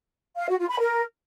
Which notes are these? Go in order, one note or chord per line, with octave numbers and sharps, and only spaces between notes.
F5
F#4
F4
B5
A#4